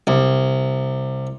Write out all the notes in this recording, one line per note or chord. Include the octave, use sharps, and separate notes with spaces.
C2